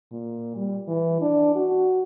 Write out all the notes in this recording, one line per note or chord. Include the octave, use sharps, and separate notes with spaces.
A#2
G3
E3
D4
F#4